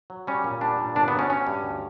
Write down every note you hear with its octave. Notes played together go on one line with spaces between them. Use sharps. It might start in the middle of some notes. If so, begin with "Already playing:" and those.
F#3
G3 C#4
A#2
G3 D4
A#2
G1 D4
B3
F#3
C#4
F#3 C#4
G2
D2